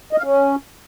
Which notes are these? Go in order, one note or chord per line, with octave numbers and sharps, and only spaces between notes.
D#5
F5
C#4